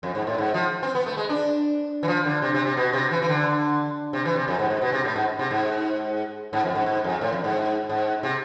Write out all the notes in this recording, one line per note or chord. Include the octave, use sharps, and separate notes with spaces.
F2
G#2
A2
G#2
F3
C4
B3
A3
G#3
D4
E3
F3
D3
C3
C3
C3
B2
C3
E3
E3
D3
C3
E3
C3
F2
G#2
G#2
B2
C3
A2
G#2
C3
G#2
G#2
F2
G#2
G#2
F2
A2
F2
G#2
G#2
C3